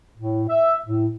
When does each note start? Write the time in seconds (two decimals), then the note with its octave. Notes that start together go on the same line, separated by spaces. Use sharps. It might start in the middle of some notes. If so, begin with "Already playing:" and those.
0.16 A2
0.49 E5
0.85 A2